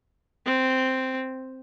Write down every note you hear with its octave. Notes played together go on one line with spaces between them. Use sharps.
C4